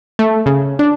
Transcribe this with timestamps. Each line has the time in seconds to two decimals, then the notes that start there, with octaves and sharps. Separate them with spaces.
0.19 A3
0.46 C#3
0.79 D4